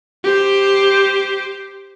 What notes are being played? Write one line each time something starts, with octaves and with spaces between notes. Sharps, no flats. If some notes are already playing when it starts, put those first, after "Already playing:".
G4 C5